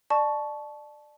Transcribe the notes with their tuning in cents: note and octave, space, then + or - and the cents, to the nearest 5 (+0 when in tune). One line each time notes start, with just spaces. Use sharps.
D5 +25 A5 -20 C#6 +0